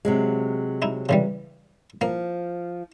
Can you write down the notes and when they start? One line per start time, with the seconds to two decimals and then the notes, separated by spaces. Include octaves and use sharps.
0.05 C3 F#3 G#3
0.82 D#4 E4
1.09 C#3 E3 G3
2.01 F3 A#3